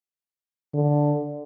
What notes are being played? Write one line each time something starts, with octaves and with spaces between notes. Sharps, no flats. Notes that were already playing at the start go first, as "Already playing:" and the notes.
D3